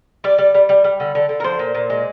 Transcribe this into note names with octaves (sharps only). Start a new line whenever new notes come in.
G3 D5
G3
G3
G3
G3
D3
D3
D3
A#4
F3 C5
A#2
A#2
G#3